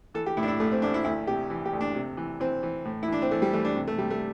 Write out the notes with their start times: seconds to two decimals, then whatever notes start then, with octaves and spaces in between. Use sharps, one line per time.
0.14 E3 A4
0.26 G4
0.37 A2 E4
0.43 D4
0.48 E4
0.60 A1 A3
0.72 C4
0.82 A1 D4
0.94 E4
1.05 D2 E4
1.27 C3 G4
1.50 E3
1.65 G4
1.73 D2
1.81 D4
1.95 C3
2.17 E3
2.40 E3 C4
2.63 E3
2.85 A2
3.03 E4
3.08 E3 D4
3.22 C4
3.31 E3 A3
3.42 G3
3.53 E3 A3
3.65 D4
3.76 C3
3.88 A3
3.98 C3 G3
4.10 A3